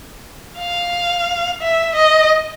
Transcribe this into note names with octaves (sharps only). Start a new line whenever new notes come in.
F5
E5
D#5